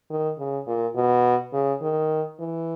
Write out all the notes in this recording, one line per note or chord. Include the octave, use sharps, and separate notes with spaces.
D#3
C#3
A#2
B2
C#3
D#3
E3